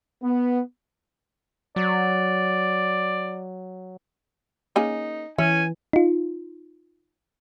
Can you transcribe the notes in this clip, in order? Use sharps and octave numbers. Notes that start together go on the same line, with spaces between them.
B3
F#3 D5
A#3 C#4 D#4 G#4
E3 C#4 E5 G#5
D#4 F4